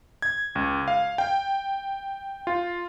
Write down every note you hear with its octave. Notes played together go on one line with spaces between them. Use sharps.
G#6
C#2
F5
G5
F4